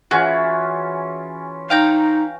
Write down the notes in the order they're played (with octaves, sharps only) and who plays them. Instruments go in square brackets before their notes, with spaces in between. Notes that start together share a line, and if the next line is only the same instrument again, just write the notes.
[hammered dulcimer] E3 C#4 F4 [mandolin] F#4 G#4
[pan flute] D#4 [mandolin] F5 G5 A#5